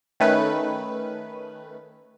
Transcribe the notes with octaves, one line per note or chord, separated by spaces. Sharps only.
D#3 A3 C#4 B4